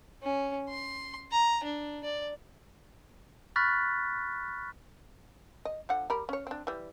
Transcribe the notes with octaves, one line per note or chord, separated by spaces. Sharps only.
C#4
C6
A#5
D4
D5
B5 C#6 F6 F#6 A6 B6
D#5
D3 F3 F#5
G3 A#4 B5
C#4 C#5
C4 D4
E3 G3